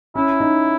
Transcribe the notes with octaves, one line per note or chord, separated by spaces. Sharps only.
C#4 E4
D#4